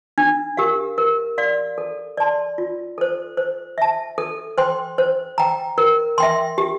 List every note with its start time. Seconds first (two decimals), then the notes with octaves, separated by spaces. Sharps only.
0.18 D4
0.57 G4 A#4 F5
0.98 A#4
1.38 D5 F5 C6
1.78 A4
2.17 D5 A5 C6
2.58 F4
2.98 A4 C5
3.37 C5
3.78 E5 A5
4.18 A4
4.58 C5 G5 C6
4.98 C5
5.38 G5 A#5
5.78 A#4
6.18 E5 G5 C6
6.58 G4